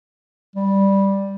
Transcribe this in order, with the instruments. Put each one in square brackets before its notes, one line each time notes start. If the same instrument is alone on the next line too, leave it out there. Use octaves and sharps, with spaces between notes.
[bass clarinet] G3